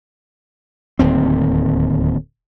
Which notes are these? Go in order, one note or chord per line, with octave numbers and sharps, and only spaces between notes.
D1 D#2 C4